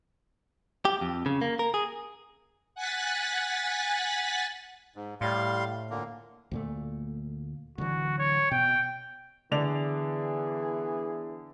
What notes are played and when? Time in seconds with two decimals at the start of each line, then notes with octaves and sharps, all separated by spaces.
0.85 G4
1.01 F2
1.26 C#3
1.41 A#3
1.59 A#4
1.74 G#4
2.75 F#5 G#5 F#6 A6 B6
4.96 G#2
5.21 A2 G3 F5 C6
5.90 A#2 D3 A#3
6.51 D2 A#2 A3
7.78 D1 D3 E3 F#4
8.19 C#5
8.51 B2 G5
9.52 D3 E3 B3 G#4 D5 F7